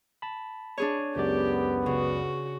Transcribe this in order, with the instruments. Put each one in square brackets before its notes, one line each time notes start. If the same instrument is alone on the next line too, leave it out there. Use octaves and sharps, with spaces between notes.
[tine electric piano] A5 B5
[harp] D4 G#4 C#5
[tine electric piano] C#2 F#2 D5 [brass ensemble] B3 [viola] G4
[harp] C#3 [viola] F#4